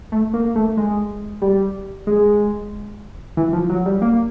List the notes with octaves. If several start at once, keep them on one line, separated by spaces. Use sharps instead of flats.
A3
A#3
A3
G#3
G3
G#3
E3
F3
F#3
G3
A#3